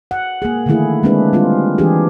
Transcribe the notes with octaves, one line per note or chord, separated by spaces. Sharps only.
F#5
A#3 G#4
D3 D#3 F3 A3 E4 G#4
G#3 A#3 C4 D4 G#4 B4
G3 C4 F4
E3 D4 G4 G#4